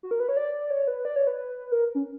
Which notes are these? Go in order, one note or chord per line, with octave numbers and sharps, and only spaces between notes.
F#4
A#4
B4
C#5
D5
C#5
B4
D5
C#5
B4
A#4
C#4